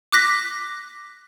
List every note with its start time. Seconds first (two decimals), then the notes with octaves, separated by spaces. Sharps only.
0.12 D6 F#6 A#6 B6